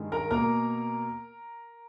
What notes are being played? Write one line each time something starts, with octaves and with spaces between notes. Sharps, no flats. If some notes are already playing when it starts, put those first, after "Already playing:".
Already playing: G2 D#3 G#3
A#4 A#5
B2 A#3 A#4 A#5